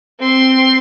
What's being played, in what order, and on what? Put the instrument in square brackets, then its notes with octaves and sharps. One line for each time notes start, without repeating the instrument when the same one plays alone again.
[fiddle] C4 C6